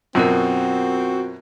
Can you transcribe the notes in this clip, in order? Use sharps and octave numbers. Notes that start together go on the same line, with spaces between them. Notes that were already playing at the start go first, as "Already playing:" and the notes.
F#2 B2 C4 F4 F#4 A#4